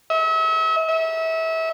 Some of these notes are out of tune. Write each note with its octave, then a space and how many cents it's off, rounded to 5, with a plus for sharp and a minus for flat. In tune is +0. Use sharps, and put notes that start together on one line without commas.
E5 -40
E5 -30